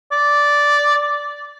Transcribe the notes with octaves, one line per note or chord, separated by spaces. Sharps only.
D5